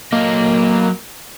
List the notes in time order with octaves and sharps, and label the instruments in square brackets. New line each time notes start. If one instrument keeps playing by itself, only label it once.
[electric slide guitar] F#3 D#5 [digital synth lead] A#3